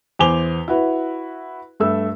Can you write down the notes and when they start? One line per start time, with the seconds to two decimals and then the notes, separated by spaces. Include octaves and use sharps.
0.19 E2 C5 G#5 D6 F7 G7
0.68 E4 F#4 B4
1.80 G2 A3 E6